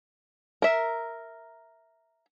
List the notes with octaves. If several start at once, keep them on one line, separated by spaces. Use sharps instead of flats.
A#4 E5